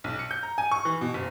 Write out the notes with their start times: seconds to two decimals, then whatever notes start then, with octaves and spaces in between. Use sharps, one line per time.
0.04 B1
0.19 C#7
0.31 G6
0.43 A#5
0.58 G#5
0.72 C#6
0.85 E3
1.01 B2
1.14 F#1